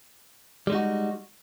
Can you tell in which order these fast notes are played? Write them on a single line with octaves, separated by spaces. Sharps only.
G3 G#3 D#4 F#4